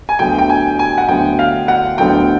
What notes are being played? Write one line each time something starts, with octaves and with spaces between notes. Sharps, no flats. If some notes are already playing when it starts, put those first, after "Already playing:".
G#5
D2 D3 F#3 B3 G5
G5
G#5
G#5
F#5
D2 D3 F#3 B3 G5
F5
F#5
D2 D3 F#3 B3 G5